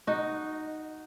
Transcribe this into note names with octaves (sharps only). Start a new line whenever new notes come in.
D#4 F#4